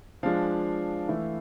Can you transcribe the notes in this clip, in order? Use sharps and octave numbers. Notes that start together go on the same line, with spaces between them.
F3 G#3 D4 F5
E3 A3 E4